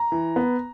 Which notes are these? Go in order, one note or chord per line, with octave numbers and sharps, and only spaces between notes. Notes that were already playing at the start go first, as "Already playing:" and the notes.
Already playing: A#5
E3
B3